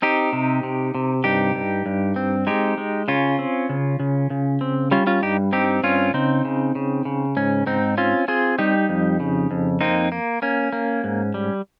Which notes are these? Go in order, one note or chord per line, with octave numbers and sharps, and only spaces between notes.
C4 D#4 G4
C3
C3
C3
G2 D#4 G4
G2
G2
C4
G#3 D#4 G4
G#3
C#3 C#4 F4
C4
C#3
C#3
C#3
C4
G3 C#4 F4
C#4 F4
G2 D#4 G4
C4 D#4 G4
G2 C#4 F4
C#3 C4 D#4
C#3
C#3
C#3
G#2 C#4
G#2 C4 D#4
C4 C#4 F4
C4 F4 G#4
G3 D#4 G4
F2
C#3
F2
A#3 C4 D#4
A#3
A#3 C#4
A#3
G#2
G3